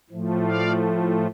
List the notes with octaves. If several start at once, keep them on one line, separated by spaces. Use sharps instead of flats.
A2 F3 A3
D5 F5